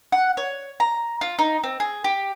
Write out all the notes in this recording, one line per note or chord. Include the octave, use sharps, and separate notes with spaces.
F#5
C#5
A#5
F4
D#4
C4
G#4
G4